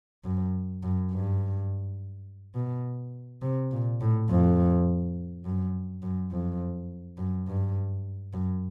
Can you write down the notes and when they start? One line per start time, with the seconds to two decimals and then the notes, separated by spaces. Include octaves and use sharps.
0.25 F#2
0.83 F#2
1.12 G2
2.55 B2
3.42 C3
3.71 A#2
4.01 A2
4.30 F2
5.45 F#2
6.03 F#2
6.31 F2
7.18 F#2
7.47 G2
8.34 F#2